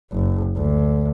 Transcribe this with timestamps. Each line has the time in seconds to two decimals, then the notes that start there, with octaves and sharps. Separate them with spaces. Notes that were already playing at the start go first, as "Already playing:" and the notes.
0.13 F#1
0.57 D2